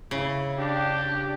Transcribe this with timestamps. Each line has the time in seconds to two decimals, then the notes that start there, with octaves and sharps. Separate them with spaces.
0.11 C#3 E4
0.59 D4 G4